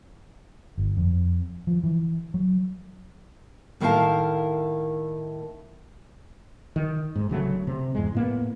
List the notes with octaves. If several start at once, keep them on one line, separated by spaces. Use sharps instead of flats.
G1
F2
F3
E3
F#3
A2 D#3 E4 A#4 F5 A5
D#3
G#2
D1 C#3 F#3 A3
C3
E2 G#2 G#3
A2 A#3 B3